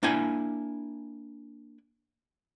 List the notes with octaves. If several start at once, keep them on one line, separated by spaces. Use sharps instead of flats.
A#3 D4 E4 G5 G#5